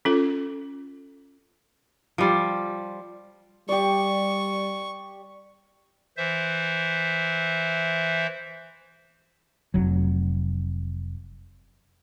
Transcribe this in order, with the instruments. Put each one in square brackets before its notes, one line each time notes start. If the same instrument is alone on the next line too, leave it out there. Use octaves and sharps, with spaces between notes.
[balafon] C#4 F4 A4
[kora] F3 G3
[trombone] G3 [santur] G4 D5 [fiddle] C#6
[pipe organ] E3 C5 E5
[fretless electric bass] F1 F#3